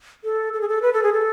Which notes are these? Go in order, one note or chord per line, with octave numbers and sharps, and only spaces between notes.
A4
A4
G#4
A4
B4
A4
G#4
A4